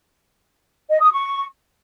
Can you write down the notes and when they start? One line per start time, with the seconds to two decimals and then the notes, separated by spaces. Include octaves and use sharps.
0.90 D#5
1.01 D#6
1.12 C#6